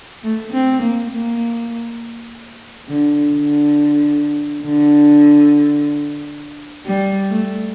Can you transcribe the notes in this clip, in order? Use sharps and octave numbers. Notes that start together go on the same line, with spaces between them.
A3
C4
A#3
A#3
D3
D3
D3
G3
A3